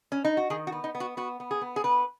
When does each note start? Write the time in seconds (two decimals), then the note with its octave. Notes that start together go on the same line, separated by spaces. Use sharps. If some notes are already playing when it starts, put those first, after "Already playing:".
0.12 C#4
0.25 D#4
0.37 F#4
0.50 D#3 G#4
0.67 F#4
0.72 B3
0.84 D#4
0.95 B3
1.00 F#4
1.17 B3 F#4
1.40 B3
1.51 G#4
1.61 B3
1.76 G#4
1.84 B3 B4